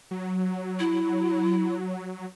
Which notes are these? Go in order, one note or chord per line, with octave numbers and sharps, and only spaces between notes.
F#3
E4